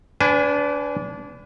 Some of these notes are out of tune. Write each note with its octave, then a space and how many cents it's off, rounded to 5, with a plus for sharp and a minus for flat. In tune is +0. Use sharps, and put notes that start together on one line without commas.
D4 -25 B4 +25 G#5 +0